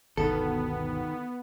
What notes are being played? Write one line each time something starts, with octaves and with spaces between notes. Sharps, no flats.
G1 D2 B2 D#3 B3 A4